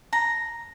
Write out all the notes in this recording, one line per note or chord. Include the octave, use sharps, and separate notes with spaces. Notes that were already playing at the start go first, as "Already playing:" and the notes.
A#5